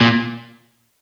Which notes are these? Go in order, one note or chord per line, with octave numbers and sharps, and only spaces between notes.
A#2